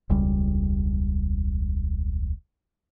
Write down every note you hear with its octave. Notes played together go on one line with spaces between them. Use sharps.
E1 C#2 G3